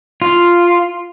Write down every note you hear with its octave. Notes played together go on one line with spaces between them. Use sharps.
F4